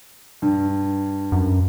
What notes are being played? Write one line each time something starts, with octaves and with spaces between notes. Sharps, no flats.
G2
F#2